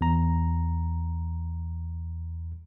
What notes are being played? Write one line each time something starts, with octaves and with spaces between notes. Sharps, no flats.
E2 A#5